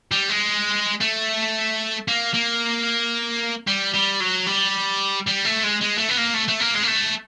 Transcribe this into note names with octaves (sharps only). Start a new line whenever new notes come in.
G3
G#3
A3
A#3
A#3
G3
G3
F#3
G3
G3
A3
G#3
G#3
A3
B3
A#3
A3
A3
A#3
G#3
A#3
A3